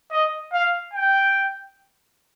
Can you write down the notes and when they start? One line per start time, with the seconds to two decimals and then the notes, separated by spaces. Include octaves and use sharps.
0.12 D#5
0.53 F5
0.94 G5